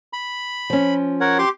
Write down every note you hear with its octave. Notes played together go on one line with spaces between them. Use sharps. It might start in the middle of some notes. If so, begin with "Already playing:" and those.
B5
F3 C#4
A#4 C#5 F#5
G4 C6 D6